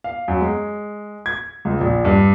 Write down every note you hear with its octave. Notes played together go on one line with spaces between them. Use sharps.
F5
F#2
G#3
G#6
C#2
A#1
G2